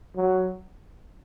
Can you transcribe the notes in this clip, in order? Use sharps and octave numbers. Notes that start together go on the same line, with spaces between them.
F#3